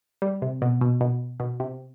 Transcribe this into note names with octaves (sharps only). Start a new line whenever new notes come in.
G3
C3
B2
B2
B2
B2
C3